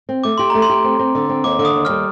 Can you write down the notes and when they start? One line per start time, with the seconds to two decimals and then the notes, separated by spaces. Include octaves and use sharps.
0.09 C4
0.24 A3 D6
0.38 G4 C6
0.50 A3 A#5
0.62 C6
0.69 G4
0.84 C4
0.99 C4
1.15 D3
1.29 C4
1.44 D#2 D6
1.59 D3 D6
1.65 D#6
1.74 D#2
1.85 G3 F6